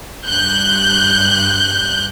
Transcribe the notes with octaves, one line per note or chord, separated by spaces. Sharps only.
G2 F#6 G6